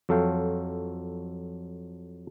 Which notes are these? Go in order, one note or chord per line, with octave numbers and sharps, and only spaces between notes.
F2 F#3 A4 C#5 F5 G5